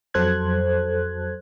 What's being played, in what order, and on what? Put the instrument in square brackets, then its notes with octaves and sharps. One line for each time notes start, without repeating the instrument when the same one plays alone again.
[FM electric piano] F2 F#3 A4 C5 F#6 G#6